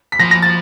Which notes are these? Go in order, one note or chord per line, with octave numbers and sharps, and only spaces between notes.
B6
F3 A#6
A#6
A6